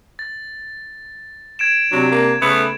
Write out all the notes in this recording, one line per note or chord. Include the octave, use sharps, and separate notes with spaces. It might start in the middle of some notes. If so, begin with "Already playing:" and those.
A6
G#6 D7 E7
C3 F#3 D4
A#3
C#3 A3 B3